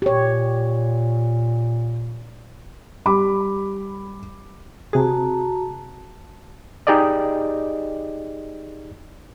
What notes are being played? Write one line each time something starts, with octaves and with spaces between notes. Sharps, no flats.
A#2 G4 C#5
G3 B5 D6
C3 F#4 G#4 A5 A#5
D#4 G4 G#4 D5 D#5